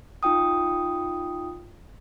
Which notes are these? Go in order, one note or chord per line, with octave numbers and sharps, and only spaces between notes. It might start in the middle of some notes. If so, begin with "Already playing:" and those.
D#4 F4 G5 D#6